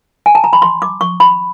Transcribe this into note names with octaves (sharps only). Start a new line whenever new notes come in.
G#5
A5
A#5
B5
C6
D6
C#6
B5